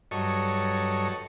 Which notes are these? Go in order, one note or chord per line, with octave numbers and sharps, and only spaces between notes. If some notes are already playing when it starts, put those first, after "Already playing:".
G2 F#3 A4 C#5 D#5 C#6